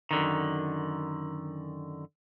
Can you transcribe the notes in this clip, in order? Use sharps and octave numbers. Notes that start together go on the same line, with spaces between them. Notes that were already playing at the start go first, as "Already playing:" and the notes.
F#2 D3 D#3